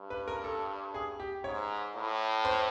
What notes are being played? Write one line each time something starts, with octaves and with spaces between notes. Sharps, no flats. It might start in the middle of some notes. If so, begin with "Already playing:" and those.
Already playing: G2
B4
A#4
A4
G#4
G4
G#2 C#5
A2
C5